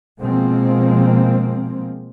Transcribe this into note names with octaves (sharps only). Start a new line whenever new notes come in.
B2 F3 G#3 A#3 C4